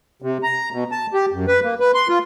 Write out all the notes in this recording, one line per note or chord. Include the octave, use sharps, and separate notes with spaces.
C3
A#5
B2
A5
G4
F#2
B4
A#3
B4
C6
F4